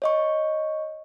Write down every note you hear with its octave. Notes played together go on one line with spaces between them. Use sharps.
C#5 D#5 C#6